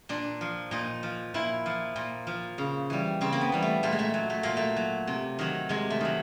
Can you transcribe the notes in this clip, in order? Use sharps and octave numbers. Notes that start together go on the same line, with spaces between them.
A#2 D4
F3
A#2 D#4
F3
A#2 E4
F3
A#2
F3
C#3
E3 G3
C#3 C4
A#3
B3
E3 G3
A3
A#2 A3
G#3
A3
F#3
A3
A#2 A#3
A3
F#3
C3
D#3 F#3
C3 G#3
A3
D#3 F#3